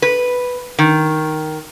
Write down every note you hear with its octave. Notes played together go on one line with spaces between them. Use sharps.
B4
D#3